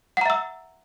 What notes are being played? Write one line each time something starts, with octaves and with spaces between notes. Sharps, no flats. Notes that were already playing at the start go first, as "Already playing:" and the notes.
E5 F#5 A#5 E6